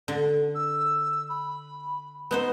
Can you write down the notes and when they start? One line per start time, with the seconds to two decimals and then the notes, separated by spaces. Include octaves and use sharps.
0.08 D3
0.55 E6
1.29 B5
2.31 B3 D#4 C5